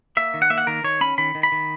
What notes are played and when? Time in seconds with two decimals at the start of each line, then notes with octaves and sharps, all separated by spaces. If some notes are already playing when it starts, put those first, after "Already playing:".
0.17 A#3 E5
0.34 D#3
0.42 F#5
0.50 A#3 E5
0.58 F#5
0.67 D#3 A#4
0.84 D#3 C#5
1.01 C#4 B5
1.18 D#3 B5
1.35 D#3
1.43 B5
1.52 D#3